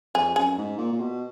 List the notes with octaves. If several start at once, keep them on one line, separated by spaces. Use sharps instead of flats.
F2 G#4
F#2 G#4
G#2
A#2
A#2
B2